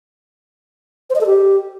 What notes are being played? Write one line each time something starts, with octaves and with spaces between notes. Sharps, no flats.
C5
D#5
A4
G4